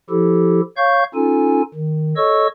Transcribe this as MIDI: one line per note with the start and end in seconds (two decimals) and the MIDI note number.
0.10 0.61 53
0.10 0.61 64
0.10 0.61 67
0.10 0.61 69
0.77 1.04 73
0.77 1.04 77
0.77 1.04 85
0.77 1.04 91
1.15 1.62 61
1.15 1.62 63
1.15 1.62 65
1.15 1.62 69
1.15 1.62 80
1.74 2.14 51
2.17 2.47 69
2.17 2.47 73
2.17 2.47 75
2.17 2.47 85
2.17 2.47 88